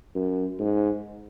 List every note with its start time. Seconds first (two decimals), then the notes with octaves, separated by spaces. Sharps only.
0.15 F#2
0.59 G#2